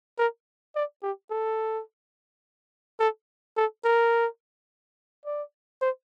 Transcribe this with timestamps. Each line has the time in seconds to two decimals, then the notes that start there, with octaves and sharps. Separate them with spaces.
0.18 A#4
0.76 D5
1.03 G4
1.31 A4
3.00 A4
3.57 A4
3.84 A#4
5.26 D5
5.81 C5